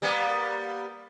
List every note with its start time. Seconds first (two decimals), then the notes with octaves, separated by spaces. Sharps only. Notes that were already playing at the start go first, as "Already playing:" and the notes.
0.02 G3 A#3 B3